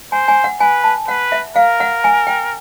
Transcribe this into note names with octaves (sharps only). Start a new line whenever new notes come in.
C5 G#5
G#5
F#5
B4 G#5
A5
B4 F#5
E5
A#4 F5
F#5
G#5
G5